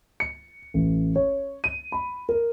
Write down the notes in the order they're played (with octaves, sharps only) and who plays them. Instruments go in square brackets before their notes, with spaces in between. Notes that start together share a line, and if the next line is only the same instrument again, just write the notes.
[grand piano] C#7
A1
C#5
D#7
B5
A#4